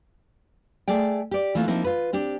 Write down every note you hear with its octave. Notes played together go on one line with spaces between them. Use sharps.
A3 G#4 D5 G5
G4 D5
E3 A3 A#3 C4 F4
F3 A#3 C4 D#4 E4
F4 B4
C4 D4 G4